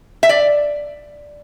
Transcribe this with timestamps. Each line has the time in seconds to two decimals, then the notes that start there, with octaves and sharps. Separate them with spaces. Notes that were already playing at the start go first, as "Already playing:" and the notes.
0.23 E5
0.29 D5